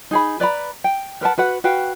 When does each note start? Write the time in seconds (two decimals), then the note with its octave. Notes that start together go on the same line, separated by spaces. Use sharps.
0.11 D#4 G#4 B5
0.40 B4 D5 A#5 B5
0.84 G5
1.21 A#4 B4 F#5 A5
1.38 F#4 B4 F#5
1.64 F#4 B4 F5 G5